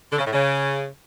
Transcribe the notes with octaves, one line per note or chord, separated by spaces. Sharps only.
D3
C#3
A2
C#3